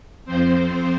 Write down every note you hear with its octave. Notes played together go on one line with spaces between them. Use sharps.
F2 F3 C4 C5